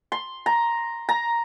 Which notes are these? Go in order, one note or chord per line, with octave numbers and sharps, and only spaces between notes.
C6
A#5
A#5